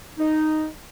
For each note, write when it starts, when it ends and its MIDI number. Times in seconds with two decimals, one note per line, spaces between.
0.18 0.65 63